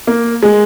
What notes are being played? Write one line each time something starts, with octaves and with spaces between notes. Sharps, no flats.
A#3
G#3